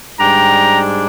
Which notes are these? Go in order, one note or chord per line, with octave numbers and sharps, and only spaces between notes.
G#2 G3 D4 G5 A#5